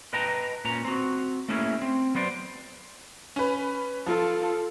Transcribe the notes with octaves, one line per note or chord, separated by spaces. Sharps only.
B4 D#5 G5 A5 A#5
A#2 C#4 A#5
C4 F#4
A3 A#3 C#4 E4 G#4
C4
F#3 B3 C5 D5
C#4 B4
F3 F4 A4